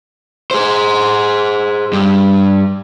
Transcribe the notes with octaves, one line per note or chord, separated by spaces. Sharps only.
G#4 C5
G2